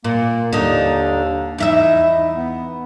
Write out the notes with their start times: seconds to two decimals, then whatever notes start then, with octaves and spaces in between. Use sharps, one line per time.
0.05 A#2 A#3
0.53 D#2 D3 D#4
1.58 E2 D#4 E4 E5
2.36 B3